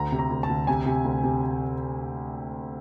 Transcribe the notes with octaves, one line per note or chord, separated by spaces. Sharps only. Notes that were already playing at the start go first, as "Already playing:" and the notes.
Already playing: D2 A#5
C3
A#5
D2
A5
D2
C3 G#5
C3
D2
C3